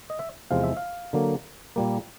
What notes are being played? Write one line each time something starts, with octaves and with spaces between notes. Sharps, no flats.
D#5
E5
E2 C3 F3 G#3 F5
E5
F5
D3 F#3 A#3
A#2 G3 A#3